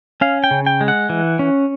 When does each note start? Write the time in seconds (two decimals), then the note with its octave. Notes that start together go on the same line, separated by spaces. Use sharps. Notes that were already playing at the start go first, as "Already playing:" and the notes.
0.21 C#4 F5
0.44 G5
0.51 C#3
0.66 G5
0.81 G#3
0.88 F#5
1.09 E3
1.39 C#4